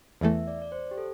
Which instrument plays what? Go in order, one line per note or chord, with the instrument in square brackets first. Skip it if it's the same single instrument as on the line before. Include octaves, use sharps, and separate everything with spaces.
[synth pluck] E2 E3 A3 [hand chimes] E5
[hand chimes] D5
D5
C5
G4
A4